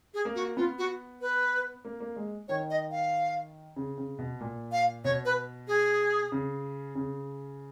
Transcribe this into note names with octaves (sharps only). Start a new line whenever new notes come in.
G#4
A#3
F#4
B3 F4
F#4
B4
A#3
A#3
G#3
D#3 C#5
D#5
F5
C#3
C#3
B2
A#2
F5
B2 C#5
B4
G#4
C#3
C#3